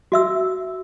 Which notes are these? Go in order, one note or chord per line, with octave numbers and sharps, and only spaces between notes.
F#4 E5 E6